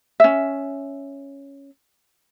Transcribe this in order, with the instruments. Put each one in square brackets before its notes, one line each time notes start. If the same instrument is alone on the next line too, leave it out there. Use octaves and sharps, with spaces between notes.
[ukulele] C#4 E5